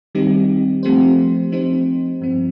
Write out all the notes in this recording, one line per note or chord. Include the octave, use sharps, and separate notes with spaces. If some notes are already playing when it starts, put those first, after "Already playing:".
D#3 G3 C4 D#4 G4
F3 A3 C4 G4 C5
F3 C4 D#4 G4 C5
G2 F3 C4